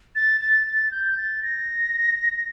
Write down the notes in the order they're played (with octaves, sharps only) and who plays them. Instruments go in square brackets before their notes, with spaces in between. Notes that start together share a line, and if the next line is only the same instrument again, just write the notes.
[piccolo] A6
A6
A6
G6
A6
A#6